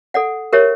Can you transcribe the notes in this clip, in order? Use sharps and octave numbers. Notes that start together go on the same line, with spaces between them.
A4 D5 F#5
G4 A#4 C#5 E5